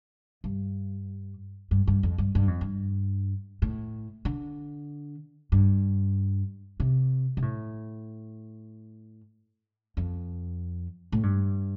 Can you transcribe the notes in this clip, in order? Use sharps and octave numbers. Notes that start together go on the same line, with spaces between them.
G2
G2
G2
F2
G2
G2
F2
G2
A2
D3
G2
C3
C3
A2
F2
A2
G2